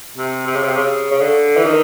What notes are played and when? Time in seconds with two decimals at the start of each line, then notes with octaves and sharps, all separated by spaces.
0.17 C3
0.47 C3
0.55 C#3
0.64 C3
0.77 C#3
1.11 C#3
1.21 D3
1.57 E3
1.66 D#3